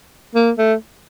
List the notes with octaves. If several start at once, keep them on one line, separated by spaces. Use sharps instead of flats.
A#3
A3